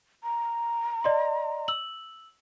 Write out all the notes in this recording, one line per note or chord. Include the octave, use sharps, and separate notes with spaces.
A#5
D5 D#5 C6
E6 F#7